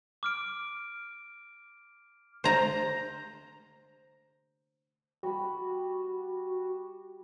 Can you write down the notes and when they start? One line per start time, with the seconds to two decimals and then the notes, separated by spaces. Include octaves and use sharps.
0.23 D6 F6 D7
2.44 C5 A#5
5.23 G3 F#4 B5